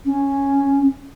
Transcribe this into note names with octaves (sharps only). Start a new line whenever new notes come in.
C#4